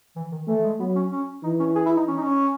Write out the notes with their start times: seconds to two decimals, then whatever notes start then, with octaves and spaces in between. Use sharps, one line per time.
0.16 E3
0.32 D#3
0.48 E3 A3
0.64 G#3
0.80 F#3 B3
0.96 C#4
1.12 C#4
1.44 E3 D#4
1.60 C#4
1.75 G#4
1.86 E4
1.97 D#4
2.08 C#4
2.17 D#4
2.23 C#4